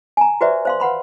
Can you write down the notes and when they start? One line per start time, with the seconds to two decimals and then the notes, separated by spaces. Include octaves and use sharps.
0.17 G#5 A#5
0.41 F#4 G4 B4 C5 D5 E5
0.65 C5 F5 C6
0.80 B4 F#5 B5 C6